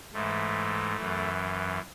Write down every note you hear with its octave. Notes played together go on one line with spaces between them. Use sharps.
G#2 E3 A3
F#2 E3